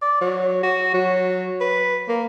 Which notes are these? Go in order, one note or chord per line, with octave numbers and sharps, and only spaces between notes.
D5
F#3
F#4
F#3
B4
A#3